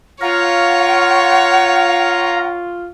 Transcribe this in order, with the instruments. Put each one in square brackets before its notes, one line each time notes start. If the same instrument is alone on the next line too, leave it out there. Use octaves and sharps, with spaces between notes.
[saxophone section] F4 [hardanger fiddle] C#5 [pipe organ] F5 A#5 [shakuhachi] F#5